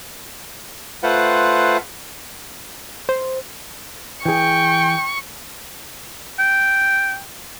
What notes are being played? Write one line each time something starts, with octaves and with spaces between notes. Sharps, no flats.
A3 F4 B4 C5 F#5
C5
E3 G#4 G5 C#6
G5